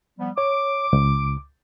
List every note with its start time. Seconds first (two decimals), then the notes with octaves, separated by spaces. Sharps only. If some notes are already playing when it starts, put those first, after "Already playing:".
0.19 F3 G3 B3
0.38 C#5 D6
0.93 C#2